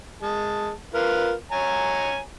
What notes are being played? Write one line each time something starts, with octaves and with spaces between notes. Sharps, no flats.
G#3 A5
F4 A#4 B4
C#5 G#5 A#5